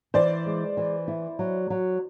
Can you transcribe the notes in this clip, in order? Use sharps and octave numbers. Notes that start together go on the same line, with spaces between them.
E3 C5 D5
G#3
E3
E4
F#3
F#3